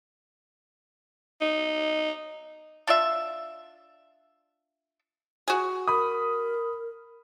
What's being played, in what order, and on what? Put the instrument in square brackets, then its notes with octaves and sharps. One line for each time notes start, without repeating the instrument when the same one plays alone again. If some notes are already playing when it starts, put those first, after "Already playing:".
[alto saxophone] D#4
[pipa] D4 F4 D5 E5
F#4 G#4
[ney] A#4 [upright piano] B5 D#6